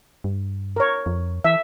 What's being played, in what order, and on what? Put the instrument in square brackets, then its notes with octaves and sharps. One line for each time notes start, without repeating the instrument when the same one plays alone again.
[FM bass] G2
[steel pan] A#4 C#5
[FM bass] F2
[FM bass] E3 [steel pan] E5